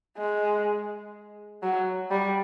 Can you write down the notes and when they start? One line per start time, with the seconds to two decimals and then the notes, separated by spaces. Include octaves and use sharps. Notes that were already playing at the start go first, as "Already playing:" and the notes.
0.18 G#3
1.63 F#3
2.11 G3